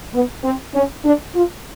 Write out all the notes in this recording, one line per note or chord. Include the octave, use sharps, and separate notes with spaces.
B3
C4
C#4
D4
F4